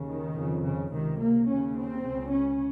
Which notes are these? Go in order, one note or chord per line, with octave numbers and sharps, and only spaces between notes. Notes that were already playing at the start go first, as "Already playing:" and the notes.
Already playing: D#2 C#3
D#3
F2 C#3
C#3
C#2 C3 D#3
A#3
D#2 C#3 C#4
C4
C#2 C#3
C#4